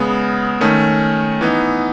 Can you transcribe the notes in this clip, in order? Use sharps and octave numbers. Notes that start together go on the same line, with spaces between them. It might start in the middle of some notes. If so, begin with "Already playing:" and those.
Already playing: C#3 G#3 B3
D#3 A3 C#4
E3 B3 D#4